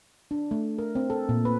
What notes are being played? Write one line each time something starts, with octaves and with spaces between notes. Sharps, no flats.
D4
A3
A#4
C4
A4
A#2
B4